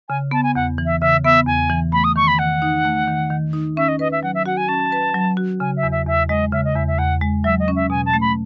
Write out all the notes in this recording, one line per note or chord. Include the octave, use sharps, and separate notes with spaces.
C#3 G#5
B3 A5
G#5
E2 F#5
E3
E5
C#3 E5
B3 E5
E2 G#5
E3
A3 B5
D#6
D#3 C#6
B5
D#3 F#5
D#4
A3
D#3
D#3
D#4
C#4 E5
D#5
B4 D#5
E5
F#3 F#5
E5
F#4 F#5
G#5
C#4 A5
B4
F#3
F#4
C#3 G#5
E5
E2
E5
E2 E5
G#3 D#5
C#3 E5
D#5
E2 E5
E5
E2 F#5
G#3
F#3 E5
D#5
C#4
E5
B2 G#5
A5
A3
B5